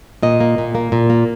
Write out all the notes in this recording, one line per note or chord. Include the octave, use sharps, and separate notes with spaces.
A#2 D#5
A#3
A#2
A#3
A#2
A#3